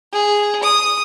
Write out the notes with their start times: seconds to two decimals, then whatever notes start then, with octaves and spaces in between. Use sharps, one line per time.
0.12 G#4
0.63 D#6